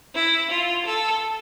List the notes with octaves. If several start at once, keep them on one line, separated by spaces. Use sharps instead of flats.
E4
F4
A4